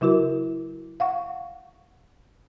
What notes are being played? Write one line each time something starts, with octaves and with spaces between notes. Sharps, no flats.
C#3 F#3 E4 F#4 A#4
F5 F#5 C#6